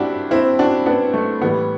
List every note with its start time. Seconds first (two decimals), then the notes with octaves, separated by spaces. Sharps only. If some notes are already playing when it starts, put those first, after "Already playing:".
Already playing: G2 G3 C4 D4 E4 F#4 G4
0.31 C4 E4
0.59 D4 F#4
0.86 B3 D4
1.14 A3
1.42 A2 E3 G3 B3